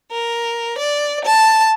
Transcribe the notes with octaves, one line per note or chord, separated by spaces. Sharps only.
A#4
D5
A5